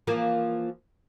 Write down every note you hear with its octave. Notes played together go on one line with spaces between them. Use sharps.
E3 F3 A#3